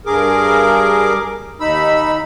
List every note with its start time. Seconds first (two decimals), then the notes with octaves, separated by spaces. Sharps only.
0.06 G2 G#4 A#4 D6
1.60 D#2 D#4 B5 E6